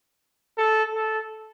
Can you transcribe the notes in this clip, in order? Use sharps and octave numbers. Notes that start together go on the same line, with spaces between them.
A4
A4